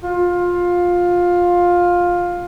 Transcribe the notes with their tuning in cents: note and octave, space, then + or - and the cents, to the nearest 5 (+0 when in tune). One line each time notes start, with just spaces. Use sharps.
F4 +15